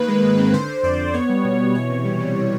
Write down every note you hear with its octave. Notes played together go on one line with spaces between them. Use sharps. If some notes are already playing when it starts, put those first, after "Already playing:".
Already playing: D#3 A#3 B4
G#3
G#2
C4
D3 C5
D3
F2 D5
F2
B3 C#5
G3
B2
B2
E3 C#5
C3
G3
G3